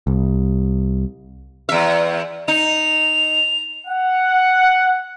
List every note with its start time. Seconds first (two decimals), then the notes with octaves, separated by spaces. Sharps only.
0.07 C2
1.69 E2 E5
2.48 D#4 F7
3.87 F#5